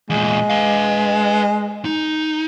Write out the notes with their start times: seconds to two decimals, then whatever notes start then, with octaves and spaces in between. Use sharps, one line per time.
0.10 E2 A#2 G#3
0.50 B4 F5
1.85 D#4